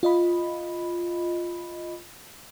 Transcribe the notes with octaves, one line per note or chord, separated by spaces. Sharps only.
F4 D#5 B5